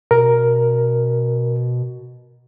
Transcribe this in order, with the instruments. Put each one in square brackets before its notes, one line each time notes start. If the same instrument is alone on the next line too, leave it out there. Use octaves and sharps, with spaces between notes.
[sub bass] B2 [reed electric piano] A#4